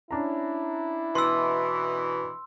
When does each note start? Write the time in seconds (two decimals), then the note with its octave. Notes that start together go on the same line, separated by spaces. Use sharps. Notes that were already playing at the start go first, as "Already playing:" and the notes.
0.11 C#4 D4 E4 A#5
1.15 B2 E3 C6 E6